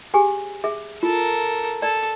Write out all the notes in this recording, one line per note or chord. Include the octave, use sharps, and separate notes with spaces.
G4 G#4 G#5
G#4 E5
F4 A4 A#4
A4 D5